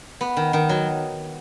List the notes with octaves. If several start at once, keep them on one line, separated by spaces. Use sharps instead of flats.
B3
D#3
D#3
F#3